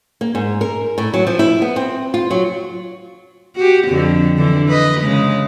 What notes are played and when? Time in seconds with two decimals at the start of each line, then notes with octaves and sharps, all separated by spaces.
0.21 A#3
0.35 G#2
0.61 A#4
0.98 A2
1.14 F#3
1.27 F3
1.39 E4
1.62 B3
1.76 C4
2.14 F4
2.31 F#3
3.56 F#4 G4
3.89 F2 D3
4.37 D3 E3
4.69 B4 D#5
5.01 C#3 G#3